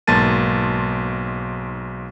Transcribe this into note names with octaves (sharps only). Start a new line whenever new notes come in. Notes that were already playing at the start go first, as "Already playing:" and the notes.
B1 G#2 A#3 A5 A6 D#7